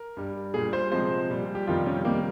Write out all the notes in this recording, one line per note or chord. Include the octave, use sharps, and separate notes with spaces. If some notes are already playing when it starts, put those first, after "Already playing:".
Already playing: A#4
G2 G3
A#2 G3 G#4
C5
C3 F3 G#3 C5
A#2 G3
G4
F2 C3 D#3 G3 F4
C#4
C3 D#3 G3 A#3